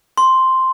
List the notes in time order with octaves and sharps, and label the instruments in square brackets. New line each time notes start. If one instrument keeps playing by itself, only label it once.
[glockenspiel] C6